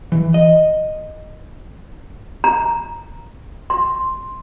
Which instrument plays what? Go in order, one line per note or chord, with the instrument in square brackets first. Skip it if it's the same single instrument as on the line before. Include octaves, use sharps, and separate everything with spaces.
[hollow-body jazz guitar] E3
D#5
[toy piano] A#5
C6